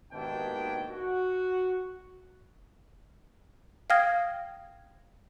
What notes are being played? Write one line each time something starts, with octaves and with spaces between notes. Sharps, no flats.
G#1 D#2 B2 D4 E4 G5
F#4
F5 G5 D#6 F6 G#6 A#6